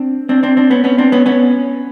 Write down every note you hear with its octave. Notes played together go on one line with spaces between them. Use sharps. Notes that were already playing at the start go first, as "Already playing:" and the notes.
Already playing: C4 D4
C4 D4
C4 D4
C4 D4
B3 C#4
B3 C#4
C4 D4
B3 C#4
B3 C#4